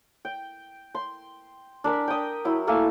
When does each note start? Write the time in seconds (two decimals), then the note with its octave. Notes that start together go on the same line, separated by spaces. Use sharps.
0.25 G5
0.95 C6
1.84 D4 A#4 G#5 B5
2.08 G5 D#6
2.45 F#3 E4
2.67 A3 A#3 A4 G#5